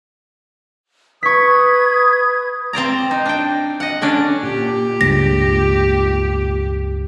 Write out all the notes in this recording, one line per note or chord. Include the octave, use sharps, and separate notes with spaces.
B4 C#6 D#6 G#6 B6
C4 C5 D5 A#5
D#4
D4 G5
D#5 F#5
D3 C#4 D4 D5
A#2 G4
C#2 G2 A#6